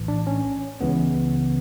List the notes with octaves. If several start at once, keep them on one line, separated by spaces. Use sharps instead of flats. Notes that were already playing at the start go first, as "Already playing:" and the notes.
Already playing: A#1 A2 E3
D4
C#4
C#2 C#3 E3 B3